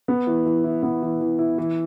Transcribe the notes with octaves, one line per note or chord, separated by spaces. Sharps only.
B3
E3
E3
E4
B3
E3
E3
E4
E3